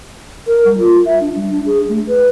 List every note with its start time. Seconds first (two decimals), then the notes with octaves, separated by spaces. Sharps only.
0.47 A#4
0.65 G3
0.78 F4
1.05 E5
1.20 D4
1.35 G3
1.51 D4
1.66 G#4
1.89 A3
2.07 B4